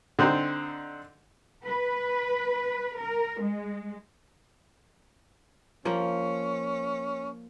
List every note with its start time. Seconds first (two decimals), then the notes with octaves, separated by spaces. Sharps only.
0.19 D3 C4 D#4
1.66 B4
3.00 A#4
3.42 G#3
5.85 F3 A#3 C#4